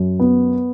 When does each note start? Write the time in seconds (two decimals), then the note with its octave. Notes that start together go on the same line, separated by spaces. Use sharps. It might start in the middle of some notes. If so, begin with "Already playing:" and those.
Already playing: F#2
0.20 B3